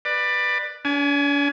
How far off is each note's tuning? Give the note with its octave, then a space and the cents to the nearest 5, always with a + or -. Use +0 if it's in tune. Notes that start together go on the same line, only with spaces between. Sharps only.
B4 +0 D5 +20
D4 -45 G#5 +20